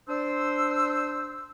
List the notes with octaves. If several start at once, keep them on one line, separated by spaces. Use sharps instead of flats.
D4 C5 E6